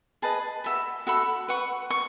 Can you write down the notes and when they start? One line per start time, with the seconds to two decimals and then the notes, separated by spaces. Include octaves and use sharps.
0.22 G#4 B4 D#5 A5
0.64 F#4 A4 E5 B5
1.07 F#4 A4 E5 B5
1.48 B4 F#5 C#6
1.90 C#6